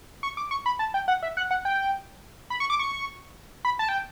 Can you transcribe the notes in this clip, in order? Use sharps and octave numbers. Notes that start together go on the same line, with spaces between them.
C#6
D6
C#6
B5
A5
G5
F#5
E5
F#5
F#5
G5
B5
C#6
D6
C#6
B5
A5
G5